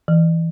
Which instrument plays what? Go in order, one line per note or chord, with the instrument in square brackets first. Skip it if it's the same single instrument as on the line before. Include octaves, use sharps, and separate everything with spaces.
[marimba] E3